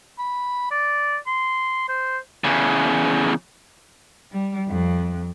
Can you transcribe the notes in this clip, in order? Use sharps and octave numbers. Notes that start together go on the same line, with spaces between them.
B5
D5
C6
C5
E2 C#3
G3
F2